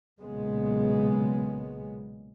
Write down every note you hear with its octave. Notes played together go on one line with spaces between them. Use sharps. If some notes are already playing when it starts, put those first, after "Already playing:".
B1 A#2 C#3 G#3 B3